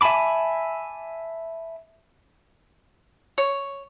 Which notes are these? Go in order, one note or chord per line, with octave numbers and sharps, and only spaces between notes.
E5 G#5 A5 B5 D6
C#5